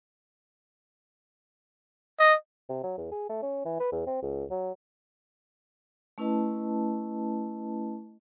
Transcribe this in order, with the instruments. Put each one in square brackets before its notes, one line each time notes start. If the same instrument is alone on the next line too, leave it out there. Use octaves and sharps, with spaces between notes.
[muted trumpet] D#5
[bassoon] C3
F#3
E2
G#4
A3
C#4
E3
B4
E2
C4
C#2
F#3
[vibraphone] A3 C#4 E4 B4 D#5 A5